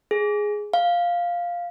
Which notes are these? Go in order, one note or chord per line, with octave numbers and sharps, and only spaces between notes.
G#4
F5